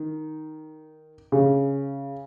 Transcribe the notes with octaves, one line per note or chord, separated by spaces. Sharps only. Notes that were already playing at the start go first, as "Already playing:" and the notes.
Already playing: D#3
C#3